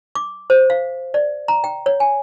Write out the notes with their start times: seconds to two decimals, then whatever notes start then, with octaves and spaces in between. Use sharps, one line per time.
0.15 D6
0.50 C5
0.70 F5
1.14 D5
1.48 A#5
1.64 G5
1.86 C#5
2.00 G#5